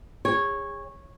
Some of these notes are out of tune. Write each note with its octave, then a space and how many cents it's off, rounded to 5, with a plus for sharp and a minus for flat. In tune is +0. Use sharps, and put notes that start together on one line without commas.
G#4 -35 C#5 -10